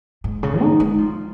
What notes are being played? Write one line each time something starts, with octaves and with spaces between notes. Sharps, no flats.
G#2
C#3
D#4
G#3
F3